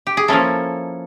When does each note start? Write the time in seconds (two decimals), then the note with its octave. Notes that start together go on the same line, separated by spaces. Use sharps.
0.07 G4
0.17 G#4
0.28 F3 A#3 C#4 E4 A4